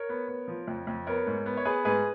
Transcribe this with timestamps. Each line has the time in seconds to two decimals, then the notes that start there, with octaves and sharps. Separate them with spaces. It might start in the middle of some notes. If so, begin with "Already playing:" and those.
Already playing: A#4 C#5
0.09 B3
0.28 B3
0.48 F3
0.68 F2
0.87 F2
1.07 B3 A#4 C#5
1.27 G#2
1.46 B3
1.57 C#5
1.65 B3 G#4 B4
1.85 G#2 G#4 B4